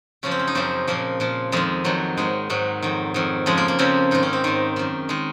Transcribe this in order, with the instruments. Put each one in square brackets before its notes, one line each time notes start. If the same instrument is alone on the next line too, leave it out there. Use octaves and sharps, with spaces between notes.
[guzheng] F#2 C#3 F3 C#4
C4
C#4
D#4
F#2 C#3 F3 C4
A#2 F3 A#3
A#2 F3
F2 D#3 G#3
F2 D#3 F#3
G#2 D#3 G#3
G#2 D#3 F#3
F2 D#3
F2 D#3
F2 C#3 F3 G#3
A#3
A#3
F2 C#3 F3 C4
G#2 D#3 D#4
C#4
C4
G#2 D#3
F#2 D#3
D#3 G#3